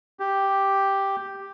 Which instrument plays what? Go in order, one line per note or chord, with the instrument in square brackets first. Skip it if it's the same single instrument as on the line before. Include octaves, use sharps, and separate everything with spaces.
[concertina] G4